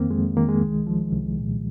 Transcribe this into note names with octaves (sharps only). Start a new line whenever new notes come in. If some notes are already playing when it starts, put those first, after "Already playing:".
Already playing: F2 D#3 A#3 C4
F2 G#3
D#3 A#3
G#3
C2
F3
C2
A#2